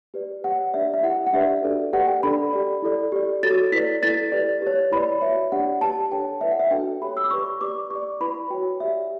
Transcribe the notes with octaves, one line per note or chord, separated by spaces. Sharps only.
G4 B4 D5
G4 C#5 F#5
D4 G4 B4 D5 E5
E5
E4 G4 D5 F#5
F#5
D4 G4 B4 D5 E5
D4 F#4 A4 D5
G4 B4 D5 F#5
G5
D4 A4 D5 B5
G4 D5
E4 A4 D5
G4 D5
F#4 A4 C#5 A6
E4 B4 D5 B6
E4 A4 D5 A6
G4 B4 D5
G4 C#5
E4 B4 D5 B5
F#4 C#5 E5
D4 G4 D5 F#5
G4 B4 D5 A5
D4 A4 C#5 G5
E4 B4 D5 E5
F#5
E5
D4 F#4 A4 D5 G5
G4 C#5 B5
E6
D6
G4 B4 D5 C#6
G4 B4 D5 D6
G4 D5 C#6
E4 B4 D5 B5
F#4 C#5 G5
G4 D5 E5